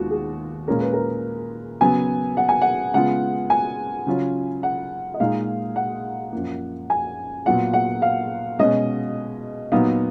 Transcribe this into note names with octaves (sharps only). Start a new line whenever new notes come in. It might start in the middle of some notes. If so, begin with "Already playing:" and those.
Already playing: D#2 D#3 G#3 B3 F4 F#4
G#4
A#2 G#3 C#4 F4 A#4
B4
A#4
C#3 F#3 B3 G#5
F#5
G#5
F#5
C#3 G#3 B3 F4 F#5
G#5
C#3 F#3 C#4 F4
F#5
D#5
A#2 G#3 D#4 F5
F#5
F#2 F3 A#3
G#5
A#2 F#3 B3 F4 F#5
F#5
F5
B2 G#3 C#4 D#5
A#2 F#3 B3 D#4 F5